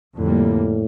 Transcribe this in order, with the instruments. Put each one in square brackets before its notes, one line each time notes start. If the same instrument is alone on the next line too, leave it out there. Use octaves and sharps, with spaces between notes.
[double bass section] F2 D3 G3 A#3 [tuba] A2